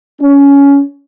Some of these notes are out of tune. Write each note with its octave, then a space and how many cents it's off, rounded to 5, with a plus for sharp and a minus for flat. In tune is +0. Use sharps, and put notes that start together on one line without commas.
C#4 +15